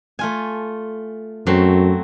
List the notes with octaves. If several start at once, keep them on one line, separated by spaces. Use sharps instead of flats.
A3 F4 G#5
F#2 F#3 A3 C4